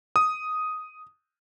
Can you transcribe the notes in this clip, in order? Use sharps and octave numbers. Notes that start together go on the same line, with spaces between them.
D#6